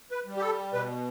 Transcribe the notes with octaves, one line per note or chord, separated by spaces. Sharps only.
B4
G3
G4
A4
B2 B4